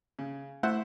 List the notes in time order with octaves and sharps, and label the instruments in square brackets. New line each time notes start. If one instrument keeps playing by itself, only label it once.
[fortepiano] C#3
[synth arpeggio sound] A3 [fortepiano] E4 C5 F#5